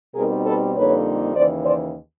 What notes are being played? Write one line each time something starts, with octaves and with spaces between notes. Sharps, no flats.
B2 G3 C4 D#4 G#4 A#4
A4 B4
F2 D3 G3 A#3 D#4 B4 C#5
D#2 C#3 E3 C5 D5
C5 D5